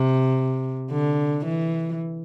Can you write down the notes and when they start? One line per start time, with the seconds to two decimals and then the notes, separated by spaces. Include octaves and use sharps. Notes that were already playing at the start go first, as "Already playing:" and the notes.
Already playing: C3
0.91 D3
1.45 E3